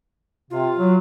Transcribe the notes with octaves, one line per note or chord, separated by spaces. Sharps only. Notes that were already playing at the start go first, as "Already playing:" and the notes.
C3 F4
F#3